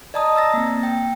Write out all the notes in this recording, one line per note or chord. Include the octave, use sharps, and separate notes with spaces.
D5 D#5 A5 A#5 D#6
A#5 E6 A6 A#6
A#3 C4
G5